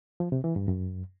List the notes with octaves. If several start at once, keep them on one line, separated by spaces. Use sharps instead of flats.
F3
C3
E3
G2
F#2